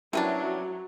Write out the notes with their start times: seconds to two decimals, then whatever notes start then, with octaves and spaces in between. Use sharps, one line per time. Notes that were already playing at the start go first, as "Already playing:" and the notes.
0.13 C3 F#3 B3 C#4 D4 E4 A#4